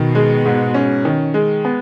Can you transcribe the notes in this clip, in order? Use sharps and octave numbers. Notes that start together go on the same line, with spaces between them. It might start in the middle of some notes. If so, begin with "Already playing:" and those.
Already playing: B2 D#3
G#3
G#2
C#4
D#3
G#3
B3